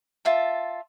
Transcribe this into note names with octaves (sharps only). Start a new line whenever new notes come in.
F4 E5 A5